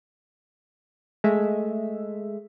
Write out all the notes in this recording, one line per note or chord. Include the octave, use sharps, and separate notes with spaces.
G#3 A3 E5